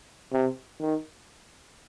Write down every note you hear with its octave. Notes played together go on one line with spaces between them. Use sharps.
C3
D#3